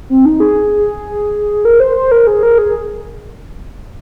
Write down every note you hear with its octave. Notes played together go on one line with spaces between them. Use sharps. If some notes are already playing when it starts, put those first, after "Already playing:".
C4
D#4
G#4
A#4
C5
C5
A#4
G#4
A#4
G#4